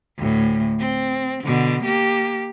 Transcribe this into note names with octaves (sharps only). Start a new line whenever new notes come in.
D2 A2
C4
B2 D3
A#3 G4